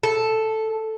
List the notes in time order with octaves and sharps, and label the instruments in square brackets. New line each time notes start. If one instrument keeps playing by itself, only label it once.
[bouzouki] A4